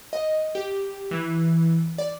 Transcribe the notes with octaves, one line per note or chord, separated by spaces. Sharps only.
D#5
G4
E3
D5